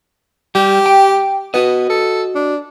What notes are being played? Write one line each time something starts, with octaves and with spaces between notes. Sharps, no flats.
G3 G4
G5
B3 F#4 D#5
A4
D4